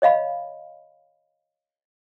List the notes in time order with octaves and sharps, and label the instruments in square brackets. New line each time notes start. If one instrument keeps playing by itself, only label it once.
[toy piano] C#5 D#5 F5 B5